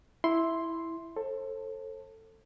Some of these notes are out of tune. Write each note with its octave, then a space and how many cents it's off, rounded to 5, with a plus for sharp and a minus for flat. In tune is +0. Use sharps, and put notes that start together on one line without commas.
E4 +0 C6 +0
A4 +15 C5 +40